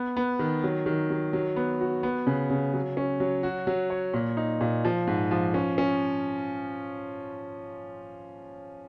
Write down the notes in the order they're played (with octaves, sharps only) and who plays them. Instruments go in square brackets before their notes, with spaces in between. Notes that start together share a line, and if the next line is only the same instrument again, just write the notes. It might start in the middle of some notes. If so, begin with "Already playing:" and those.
Already playing: [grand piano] B3
B3
D#3
F#3
D#3
F#3
F#3
B3
F#4
B3
C#3
C#3
F#3
C#4
F#3
F#4
F#3
C#5
A#2
D#4
A#2
F3
G#2
F3
C#4
C#4